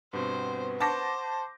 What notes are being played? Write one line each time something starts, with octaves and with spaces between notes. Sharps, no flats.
G2 B2 B3 C4 C5
C5 F#5 A5 C#6 D6 G6 A#6